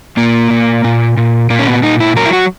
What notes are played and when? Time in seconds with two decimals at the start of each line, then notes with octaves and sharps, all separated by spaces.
0.17 A#2 A#3
0.50 A#2
0.84 A#2
1.17 A#2
1.50 A#2 A#3
1.59 C#4
1.67 B3
1.82 A#2 D#4
2.00 E4
2.16 F#3 A#4
2.26 E4
2.33 F#4